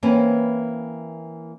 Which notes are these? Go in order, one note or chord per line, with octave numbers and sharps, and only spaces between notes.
E3 A#3 C4 C#4 B4